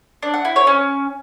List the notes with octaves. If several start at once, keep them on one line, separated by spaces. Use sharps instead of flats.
D4
F#5
E4
C#5
C#4